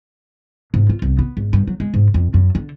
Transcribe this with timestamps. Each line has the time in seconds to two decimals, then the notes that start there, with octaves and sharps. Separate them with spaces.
0.74 G#2
0.90 F4
1.02 C2
1.19 B3
1.37 G#1
1.53 G2
1.68 F#3
1.80 G#3
1.94 G#2
2.14 F2
2.34 F#2
2.55 D3